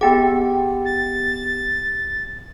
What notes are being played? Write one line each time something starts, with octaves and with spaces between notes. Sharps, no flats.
B3 G4 G#4 F#5 G5
A6